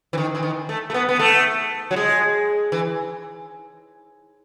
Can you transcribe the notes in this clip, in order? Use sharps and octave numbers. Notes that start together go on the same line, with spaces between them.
E3
D#3
E3
D#3
A3
A3
B3
B3
A3
F#3
G#3
E3